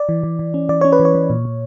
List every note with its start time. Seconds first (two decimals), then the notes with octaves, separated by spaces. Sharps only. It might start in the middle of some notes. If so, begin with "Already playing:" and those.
Already playing: D5
0.09 E3
0.23 E3
0.39 E3
0.54 C#4
0.69 E3 D5
0.81 C#4 C#5
0.92 B4
1.00 E3
1.05 C#5
1.15 E3
1.30 A#2
1.45 A#2